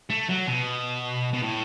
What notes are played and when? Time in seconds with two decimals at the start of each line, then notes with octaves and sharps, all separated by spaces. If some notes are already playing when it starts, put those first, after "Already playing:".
0.10 A3
0.29 F#3
0.47 B2
1.33 B2
1.43 A2